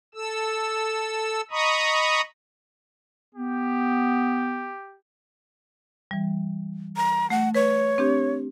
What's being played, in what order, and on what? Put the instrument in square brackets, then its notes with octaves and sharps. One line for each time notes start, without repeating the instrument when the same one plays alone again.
[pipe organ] A4 E6
D#5 A#5 B5 C#6 D#6
[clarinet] B3 [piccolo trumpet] G4
[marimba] E3 G3
[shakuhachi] A#5
[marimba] A3 [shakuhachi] F#5
[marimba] B4 [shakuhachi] C#5
[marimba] C4 D4 G4